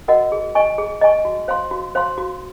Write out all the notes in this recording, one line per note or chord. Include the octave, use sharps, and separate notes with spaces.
F#4 A#4 D#5 F#5
G#4
D#5 G#5 C#6
G#4
D#5 G#5 C#6
F#4
C5 F5 C6
F#4
C5 F5 C6
F#4